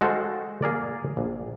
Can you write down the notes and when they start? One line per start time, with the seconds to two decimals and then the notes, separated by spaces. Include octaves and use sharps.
0.01 G#3 F#4 A4 C5 F5 G5
0.62 A#3 G#4 A#4 D5
1.17 A#1